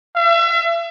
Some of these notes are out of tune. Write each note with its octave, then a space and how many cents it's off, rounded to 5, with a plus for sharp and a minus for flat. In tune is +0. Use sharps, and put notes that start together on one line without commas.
E5 +40